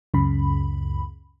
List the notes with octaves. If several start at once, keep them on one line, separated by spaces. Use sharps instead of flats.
C#2 F#2 C#3 B5